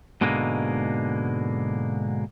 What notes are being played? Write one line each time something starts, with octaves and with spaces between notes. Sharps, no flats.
G#2 B2 D3 G#3 A#3